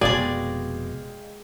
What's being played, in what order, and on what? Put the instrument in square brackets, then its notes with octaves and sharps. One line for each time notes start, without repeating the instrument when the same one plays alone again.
[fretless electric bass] F1 B2 [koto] G#3 G#4 [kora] D5 [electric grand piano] D#5 F5 G5